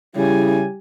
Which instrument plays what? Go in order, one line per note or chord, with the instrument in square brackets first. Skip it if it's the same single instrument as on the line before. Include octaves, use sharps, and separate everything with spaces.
[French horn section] C#3 E4 [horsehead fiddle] G3 G#5